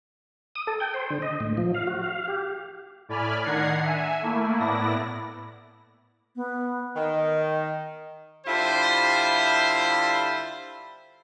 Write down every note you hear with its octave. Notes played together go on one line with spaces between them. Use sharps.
D#6
A4
G5
C5
D3
D#5
A2
F3
F5
F#4
F5
G4
A2 D5 G#5 B5 F6
D#3 D4 F#5 A#5 G#6 C7
E5 G#5
A3 A#3 E4
A2 B3 E4 D5 A#6
B3
D#3 D#5
D3 G3 E4 F4 C5